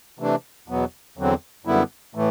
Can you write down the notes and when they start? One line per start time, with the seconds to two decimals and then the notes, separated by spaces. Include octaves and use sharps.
0.19 C3 E3 A3 D4
0.68 E2 B2 F#3 B3
1.17 E2 D3 F#3 C4
1.65 F#2 D3 G3 B3 E4
2.15 A2 E3 A3